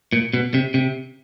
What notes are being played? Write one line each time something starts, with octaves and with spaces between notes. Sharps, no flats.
A#2
B2
C3
C3